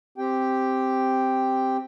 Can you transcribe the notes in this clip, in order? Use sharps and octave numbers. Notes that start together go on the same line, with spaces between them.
C4 G4 G5